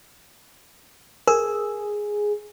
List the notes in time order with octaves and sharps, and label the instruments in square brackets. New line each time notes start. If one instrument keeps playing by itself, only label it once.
[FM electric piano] G#4 [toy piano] A#4